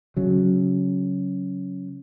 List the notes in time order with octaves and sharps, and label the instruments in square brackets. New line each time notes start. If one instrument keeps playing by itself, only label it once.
[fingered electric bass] C#3 F#3